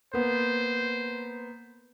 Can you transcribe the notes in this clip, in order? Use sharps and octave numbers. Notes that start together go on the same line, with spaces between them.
A#3 B3 C5